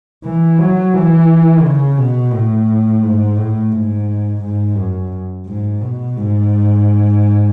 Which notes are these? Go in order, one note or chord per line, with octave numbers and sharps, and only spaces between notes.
E3
F#3
E3
C#3
B2
A2
G#2
A2
G#2
G#2
F#2
G#2
B2
G#2